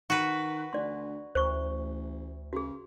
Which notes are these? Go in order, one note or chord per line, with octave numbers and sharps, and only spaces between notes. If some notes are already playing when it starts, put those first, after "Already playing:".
D#3 F#4 B4
D2 D4 D5 C6
A1 D2 C5 C#6
C#3 F#4 G#4